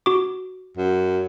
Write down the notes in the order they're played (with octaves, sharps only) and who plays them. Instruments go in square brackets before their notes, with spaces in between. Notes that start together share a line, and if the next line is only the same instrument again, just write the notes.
[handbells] F#4 D6
[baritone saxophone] F#2